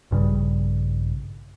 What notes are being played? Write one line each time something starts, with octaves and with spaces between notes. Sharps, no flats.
A#1 G2 C#3 G3